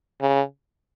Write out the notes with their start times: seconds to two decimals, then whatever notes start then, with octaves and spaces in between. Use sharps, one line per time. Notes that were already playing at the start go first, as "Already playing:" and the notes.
0.21 C#3